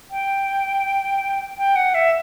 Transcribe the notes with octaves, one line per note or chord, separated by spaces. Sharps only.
G5
G5
F#5
E5